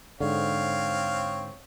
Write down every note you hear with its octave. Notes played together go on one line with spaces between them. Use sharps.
G#2 D3 C4 C#5 F5